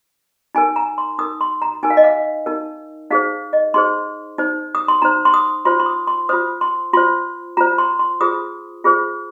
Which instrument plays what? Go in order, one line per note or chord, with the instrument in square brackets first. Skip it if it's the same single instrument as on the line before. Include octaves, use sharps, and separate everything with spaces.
[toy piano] D#4 A#4 G#5
A#5
C6
D#4 A#4 D#6
C6
A#5
D#4 A#4 G#5
F5
D#5
F5
D#4 A#4
D#4 G#4 C5 F5
D#5
D#4 G#4 C5 C6
D#4 C5
D#6
C6
D#4 C5 A#5
C6
D#6
F4 C5 C6
C6
D#6
C6
F4 C5 D#6
C6
F4 C5 C6
F4 C5 A#5
C6
C6
F4 G#4 C5 D#6
F4 G#4 C5